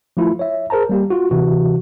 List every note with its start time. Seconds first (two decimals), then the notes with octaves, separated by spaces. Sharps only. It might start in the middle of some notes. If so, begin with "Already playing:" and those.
0.17 F3 A3 E4 F4
0.39 C#5 E5
0.70 G#4 A#4 C5 A5 A#5
0.89 G3 A#3 G4
1.10 F4 F#4
1.31 C3 E3 F#4